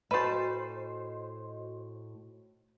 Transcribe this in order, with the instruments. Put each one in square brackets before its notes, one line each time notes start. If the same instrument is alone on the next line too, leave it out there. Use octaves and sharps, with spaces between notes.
[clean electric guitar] A2 C5 [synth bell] F#4 D#5 [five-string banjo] B4 A5